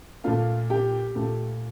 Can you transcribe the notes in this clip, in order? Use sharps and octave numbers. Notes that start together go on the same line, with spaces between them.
A#2 A3 F4 F5
G4 G5
A#2 A3